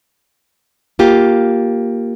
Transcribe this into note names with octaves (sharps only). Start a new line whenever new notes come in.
A#3 F4 G4